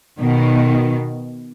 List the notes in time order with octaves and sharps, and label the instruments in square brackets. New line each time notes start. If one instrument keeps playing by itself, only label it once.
[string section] B2 D#3